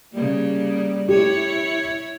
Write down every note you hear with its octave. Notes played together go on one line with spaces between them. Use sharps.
C#3 G3 A#3
E4 G4 C#5